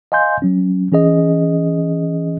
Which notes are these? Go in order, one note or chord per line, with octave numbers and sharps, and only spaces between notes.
D#5 F5 G#5 C6 G6
F#3 C#4
E3 C#4 G#4 D#5